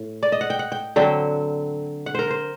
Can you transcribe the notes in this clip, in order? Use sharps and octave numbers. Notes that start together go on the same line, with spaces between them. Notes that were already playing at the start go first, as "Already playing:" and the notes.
Already playing: A2
D5
D#5
F#5
G5
F#5
G5
D3 F#3 C4 G5
F#5
A#4 C5
C5